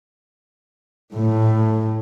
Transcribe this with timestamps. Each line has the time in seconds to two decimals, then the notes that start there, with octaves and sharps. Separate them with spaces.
1.14 A2